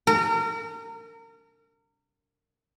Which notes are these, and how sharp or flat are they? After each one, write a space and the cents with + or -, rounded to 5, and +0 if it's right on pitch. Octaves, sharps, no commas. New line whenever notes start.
A#4 -30